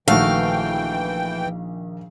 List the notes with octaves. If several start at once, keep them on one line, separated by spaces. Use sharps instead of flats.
A#1 D#3 E3 A3 F#4 F5 G5